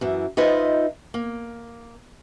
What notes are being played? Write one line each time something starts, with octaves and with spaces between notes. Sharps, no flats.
F#2 E3
D#4 F4 B4 C5 D#5 E5
A#3